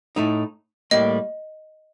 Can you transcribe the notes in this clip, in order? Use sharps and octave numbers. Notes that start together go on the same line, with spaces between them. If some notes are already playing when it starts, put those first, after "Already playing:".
A2 A3 D#4
A2 G3 A#3 D#5